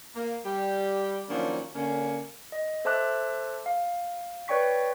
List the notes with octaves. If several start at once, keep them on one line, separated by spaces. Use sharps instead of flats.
A#3
G3 G4
D#3 F3 F#3 A#3 C#4 D4
D3 A#3 C#4
D#5
A4 C5 E5 A5 D6 F#6
F5
B4 C#5 D5 G5 C#6 B6